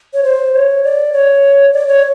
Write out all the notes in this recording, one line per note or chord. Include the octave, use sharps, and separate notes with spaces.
C#5
C5
C#5
D5
C#5
D5
C#5